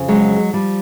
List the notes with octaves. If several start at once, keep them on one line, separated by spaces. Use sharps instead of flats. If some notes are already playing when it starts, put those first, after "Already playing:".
Already playing: F2 C#3
F#3 G#3
F3 G3